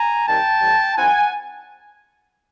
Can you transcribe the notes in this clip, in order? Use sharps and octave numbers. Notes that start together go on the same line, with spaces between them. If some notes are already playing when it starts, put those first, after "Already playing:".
Already playing: G#5 A#5
C3 D#3 G3 G5 A5
A2 E3 G3
D#3 G3 C4 E4 F#5 G#5